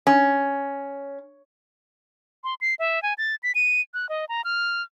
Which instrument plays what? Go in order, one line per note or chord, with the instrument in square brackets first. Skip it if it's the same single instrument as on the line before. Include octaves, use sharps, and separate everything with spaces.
[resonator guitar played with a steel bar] C#4
[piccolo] C6
C7
E5
G#5
A6
B6
D#7
F#6
D#5
A#5
F6